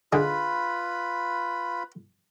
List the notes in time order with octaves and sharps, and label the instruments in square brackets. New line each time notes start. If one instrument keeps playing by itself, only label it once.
[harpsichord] D3 D#4 G#4 [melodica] F4 B4 B5